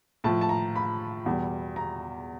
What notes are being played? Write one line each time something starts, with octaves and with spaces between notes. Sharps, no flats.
A2 F3 A5
A5
A#5
B5
E2 B2 G3
A#5